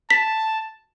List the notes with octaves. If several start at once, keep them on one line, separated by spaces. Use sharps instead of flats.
A5 B6